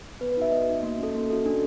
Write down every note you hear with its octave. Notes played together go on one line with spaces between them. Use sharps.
B3 B4
B4
D#4 F#4 E5
B3 D#5
D#4 F#4
A#3
C#4 F#4 A4
A#3
C#4 F#4 A4
D4